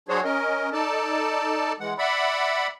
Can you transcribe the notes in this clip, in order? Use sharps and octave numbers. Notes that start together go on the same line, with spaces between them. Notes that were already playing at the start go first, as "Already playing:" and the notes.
F#3 D4 F#4 G#4 C5 C#5
C#4 A#4 D#5
D#4 A4 D5 A5
E3 G#3 F#5
D5 E5 F#5 B5